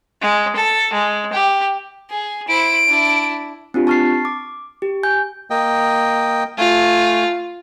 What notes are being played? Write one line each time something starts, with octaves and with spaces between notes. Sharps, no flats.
G#3
A4
G#3
G4
G#4
E4 C5 D7
D4 E4
C4 D4 F4 G4
A5 C#6 F6 A6 C7
D6
G4
G#5 G6
A#3 D#5 G5
A3 F4 G#5